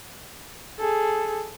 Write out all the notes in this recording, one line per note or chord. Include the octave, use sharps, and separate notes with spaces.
G#4 A4